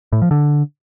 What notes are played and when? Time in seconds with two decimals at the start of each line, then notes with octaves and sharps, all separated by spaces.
0.13 A2
0.22 F3
0.31 D3